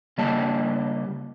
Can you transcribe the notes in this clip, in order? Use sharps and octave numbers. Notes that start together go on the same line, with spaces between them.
C#3 G3 A#3 D#5 A5